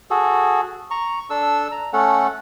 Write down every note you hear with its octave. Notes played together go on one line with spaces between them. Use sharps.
F#4 G#4 A4
A#5 C#6
D4 A4 E6
A#5
A3 C#4 A4 F#5